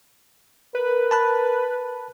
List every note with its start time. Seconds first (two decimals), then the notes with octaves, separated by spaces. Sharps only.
0.75 A#4 B4
1.11 A5 B5 F#6